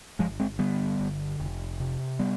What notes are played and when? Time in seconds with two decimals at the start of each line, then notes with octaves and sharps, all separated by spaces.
0.19 G1 F3 G#3
0.40 G#3 C4
0.59 D3 G3 B3
0.99 G1
1.40 F1
1.80 C3
2.19 G3 B3